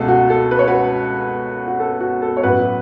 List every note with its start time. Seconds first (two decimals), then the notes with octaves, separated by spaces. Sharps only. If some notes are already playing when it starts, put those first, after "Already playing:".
Already playing: C#2 B2 A3 A4
0.08 F#4
0.30 A4
0.51 B4
0.59 C#5
0.68 F#4 B4
1.68 F#4
1.80 A4
2.00 F#4
2.22 A4
2.37 C#5
2.43 A1 A2 F#3 B3 F#4 B4
2.60 F#4